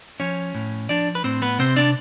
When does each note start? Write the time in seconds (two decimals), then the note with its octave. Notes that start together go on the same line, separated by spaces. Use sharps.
0.20 F3 C#4 C#5
0.55 A2
0.89 F3 D4 D5
1.15 B4
1.24 A2 C4 C5
1.42 B3 B4
1.59 C3 C4 C5
1.76 D4 D5